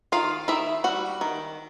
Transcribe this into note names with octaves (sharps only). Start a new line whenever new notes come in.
D#3 F4 F5
D#3 E4 E5
G3 F#4 F#5
D#3